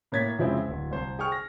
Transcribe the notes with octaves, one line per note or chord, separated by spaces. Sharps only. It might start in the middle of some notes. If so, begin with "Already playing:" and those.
A2 A#3 C#5 G#6 A6 B6
F2 C#3 F3 G#3 C4 E4
D1
C2 C5
G#4 G5 C#6 F6
A#6